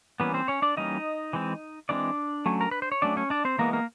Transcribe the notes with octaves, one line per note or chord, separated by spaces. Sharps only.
E3 G3 A#3 B3 C#4 B4
C4 C5
C#4 C#5
D4 D5
E3 G3 A#3 C#4 D#4 D#5
E3 G#3 C4
E3 G#3 C4 D4 D5
F#3 A3 C#4
A#4
B4
C5
C#5
F#3 A3 C#4 D4 D5
C#4 C#5
D4 D5
C4 C5
E3 G#3 A#3 B3 A#4
A#3 A#4